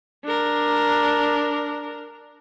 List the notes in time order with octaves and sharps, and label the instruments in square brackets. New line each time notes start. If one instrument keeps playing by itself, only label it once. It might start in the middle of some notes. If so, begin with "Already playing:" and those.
[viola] D4 A#4